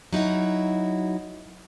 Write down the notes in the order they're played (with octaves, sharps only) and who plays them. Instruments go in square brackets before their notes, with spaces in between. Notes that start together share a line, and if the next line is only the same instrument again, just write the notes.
[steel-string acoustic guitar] F#3 D#4 E4 F#4